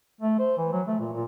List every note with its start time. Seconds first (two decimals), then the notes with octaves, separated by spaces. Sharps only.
0.21 A3
0.39 C5
0.57 E3
0.72 F#3
0.87 A3
1.00 A#2
1.13 A#2